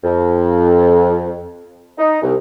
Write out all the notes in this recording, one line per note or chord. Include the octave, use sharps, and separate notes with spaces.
F2
D#4
C2